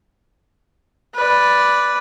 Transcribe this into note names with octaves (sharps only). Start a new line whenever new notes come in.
B4 D5